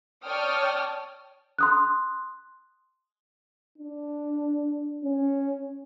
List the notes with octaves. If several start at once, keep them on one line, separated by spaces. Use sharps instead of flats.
C#5 D5 G5 A5 D#6 F6
C6 D#6 F#6
D4
C#4